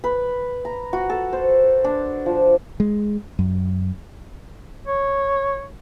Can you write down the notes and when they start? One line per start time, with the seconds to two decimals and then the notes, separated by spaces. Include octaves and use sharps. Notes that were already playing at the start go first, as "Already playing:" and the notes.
0.04 B4
0.65 A#5
0.93 F#4
1.10 A4
1.33 C5
1.84 D4
2.26 F3
2.80 G#3
3.39 F#2
4.87 C#5